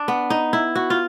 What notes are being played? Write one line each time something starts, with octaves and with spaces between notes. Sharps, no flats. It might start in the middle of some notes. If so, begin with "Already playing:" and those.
Already playing: D4
B3
D#4
E4
F#4
F4